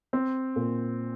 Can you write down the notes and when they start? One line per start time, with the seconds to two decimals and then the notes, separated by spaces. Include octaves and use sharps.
0.13 C4
0.56 A#2